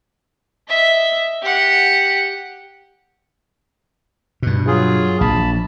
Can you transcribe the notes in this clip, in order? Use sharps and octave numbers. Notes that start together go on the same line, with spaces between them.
D#5 E5
G4 F#5
G2 B2
F#3 F4 G#4
A#1 A5 B5